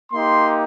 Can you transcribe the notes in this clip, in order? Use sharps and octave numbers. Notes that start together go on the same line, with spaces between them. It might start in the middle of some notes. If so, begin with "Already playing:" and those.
A#3 D#4 G4 C6